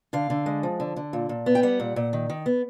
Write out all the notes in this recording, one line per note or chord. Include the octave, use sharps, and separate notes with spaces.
D3 F5
D3
G#3
F3
D3
D3
A#2
A#2
B3
G5
G3 F#5
A#2
A#2
D#3
D#3
B3